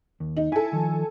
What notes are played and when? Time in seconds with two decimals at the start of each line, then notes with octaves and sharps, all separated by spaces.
0.20 D#2
0.37 D#4
0.52 E4 A4 G#5
0.73 D#3 F3